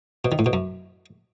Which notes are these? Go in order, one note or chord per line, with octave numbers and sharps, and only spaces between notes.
B2
D#3
A2
B2
F#2